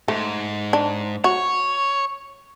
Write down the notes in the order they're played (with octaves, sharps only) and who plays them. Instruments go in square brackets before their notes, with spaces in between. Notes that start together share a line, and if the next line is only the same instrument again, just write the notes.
[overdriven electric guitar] G#2 [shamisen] A3
[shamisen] D4
[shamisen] F#4 [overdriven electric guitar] C#5